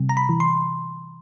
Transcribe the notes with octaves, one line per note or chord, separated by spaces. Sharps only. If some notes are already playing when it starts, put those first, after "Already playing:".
Already playing: C3 G3
A#5
B5
E3
C6